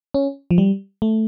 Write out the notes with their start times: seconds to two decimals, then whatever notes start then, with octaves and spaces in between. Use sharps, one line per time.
0.14 C#4
0.51 F3
0.58 G3
1.02 A3